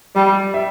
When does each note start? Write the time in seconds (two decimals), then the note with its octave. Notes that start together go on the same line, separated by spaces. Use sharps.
0.15 G3 D5
0.54 E5